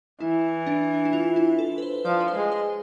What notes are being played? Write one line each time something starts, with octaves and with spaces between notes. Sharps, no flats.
E3 E4
D4
E4
F4
E4
A4
B4
C5
F3 D5
B4
C5
G#3
C5